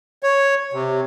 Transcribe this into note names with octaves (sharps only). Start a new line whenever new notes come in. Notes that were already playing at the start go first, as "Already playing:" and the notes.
C#5
C3